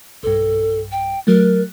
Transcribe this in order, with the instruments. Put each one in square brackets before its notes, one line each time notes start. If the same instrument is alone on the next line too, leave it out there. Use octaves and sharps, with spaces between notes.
[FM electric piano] B1 G2 [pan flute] A4
[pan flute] G5
[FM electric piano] F#3 A3 [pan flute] A#4